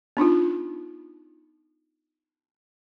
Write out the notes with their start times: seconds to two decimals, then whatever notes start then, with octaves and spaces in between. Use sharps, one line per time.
0.17 B3 D4 D#4 F4